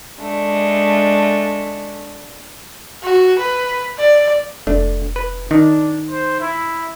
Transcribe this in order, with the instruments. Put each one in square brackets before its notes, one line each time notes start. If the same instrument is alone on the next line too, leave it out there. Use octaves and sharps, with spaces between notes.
[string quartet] G#3 A3 D4
[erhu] F#4
B4
D5
[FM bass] F1 [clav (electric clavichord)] A3 D4
[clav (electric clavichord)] B4
[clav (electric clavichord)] D#3 [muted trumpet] D4 [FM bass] D#4
[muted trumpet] C5
E4